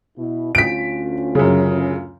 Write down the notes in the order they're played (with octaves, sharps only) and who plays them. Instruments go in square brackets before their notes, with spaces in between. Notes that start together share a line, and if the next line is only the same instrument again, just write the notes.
[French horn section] B2 E4
[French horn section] D2 C#4 F4 [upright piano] B6 D7
[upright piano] F#2 C#3